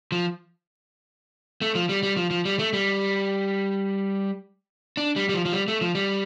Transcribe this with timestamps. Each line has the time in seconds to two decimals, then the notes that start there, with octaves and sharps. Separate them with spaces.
0.12 F3
1.62 A3
1.75 F3
1.89 G3
2.03 G3
2.17 F3
2.31 F3
2.45 G3
2.59 A3
2.73 G3
4.97 D4
5.16 G3
5.29 G3
5.34 F3
5.45 F3
5.53 G3
5.68 A3
5.81 F3
5.95 G3